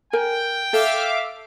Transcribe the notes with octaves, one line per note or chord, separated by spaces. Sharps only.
A#4 G5 G#5
A4 E5 F5 D6